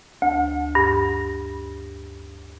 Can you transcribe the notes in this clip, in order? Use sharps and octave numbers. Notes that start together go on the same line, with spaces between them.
D2
G2